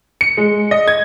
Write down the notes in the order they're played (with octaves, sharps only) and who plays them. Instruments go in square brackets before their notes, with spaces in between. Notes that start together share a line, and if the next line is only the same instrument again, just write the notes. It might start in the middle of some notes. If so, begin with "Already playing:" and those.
[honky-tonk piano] C#7
G#3
D#5
G#6